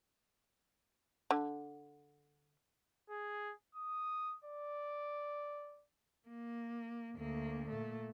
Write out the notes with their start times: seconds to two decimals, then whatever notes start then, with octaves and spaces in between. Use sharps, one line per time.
1.31 D3
3.10 G#4
3.75 D#6
4.44 D5
6.29 A#3
7.17 D2 A#3
7.70 A#2 A3